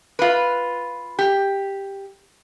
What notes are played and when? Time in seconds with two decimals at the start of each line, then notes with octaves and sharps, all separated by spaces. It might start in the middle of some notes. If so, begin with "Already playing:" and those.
0.19 F4 B4
1.19 G4